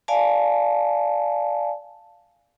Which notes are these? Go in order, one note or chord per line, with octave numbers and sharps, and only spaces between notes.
D5 F5 G#5 A5